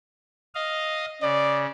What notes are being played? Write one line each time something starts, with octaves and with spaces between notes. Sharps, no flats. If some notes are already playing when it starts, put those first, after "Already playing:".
D#5 F5
C#3 D5